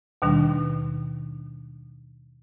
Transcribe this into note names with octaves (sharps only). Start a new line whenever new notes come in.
D#2 B2 D#3 G3 D4